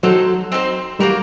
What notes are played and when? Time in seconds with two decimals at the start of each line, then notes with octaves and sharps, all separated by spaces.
0.03 F#3 C4 D#4 A4 C5
0.52 C4 D#4 A4 C5
1.00 G3 A#3 F#4 A#4